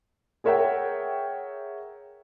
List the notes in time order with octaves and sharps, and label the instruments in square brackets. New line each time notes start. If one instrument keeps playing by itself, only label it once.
[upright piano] G#4 A#4 C#5 E5 F#5 G5